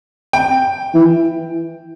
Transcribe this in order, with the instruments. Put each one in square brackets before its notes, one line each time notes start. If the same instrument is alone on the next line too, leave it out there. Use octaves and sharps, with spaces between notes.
[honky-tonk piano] G5
[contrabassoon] E3